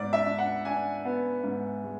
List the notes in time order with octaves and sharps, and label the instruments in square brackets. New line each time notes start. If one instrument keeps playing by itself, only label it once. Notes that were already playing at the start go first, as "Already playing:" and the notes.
Already playing: [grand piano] G#2 B3 D5
E5
D4
F#5
D4 G#5
B3
G#2
G#3